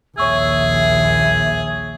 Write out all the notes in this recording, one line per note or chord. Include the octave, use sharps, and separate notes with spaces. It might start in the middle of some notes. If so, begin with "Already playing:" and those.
A#1 D#2 G#4 C#5 E5 C#6 E6